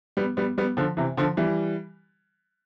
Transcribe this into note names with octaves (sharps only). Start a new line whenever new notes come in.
G3 B3
G3 B3
G3 B3
D3 F3
C3 E3
D3 F3
E3 G3